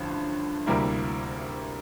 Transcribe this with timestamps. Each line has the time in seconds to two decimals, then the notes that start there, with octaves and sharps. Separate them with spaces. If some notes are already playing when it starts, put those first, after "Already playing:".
Already playing: A1 G2 D3 F3
0.66 D2 C3 G3 A#3 E4